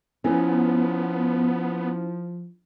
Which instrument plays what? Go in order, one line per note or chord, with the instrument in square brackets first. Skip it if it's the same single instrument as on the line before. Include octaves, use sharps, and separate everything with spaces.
[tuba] F3 [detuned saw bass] B3 [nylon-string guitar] C#4 [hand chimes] E4 A#4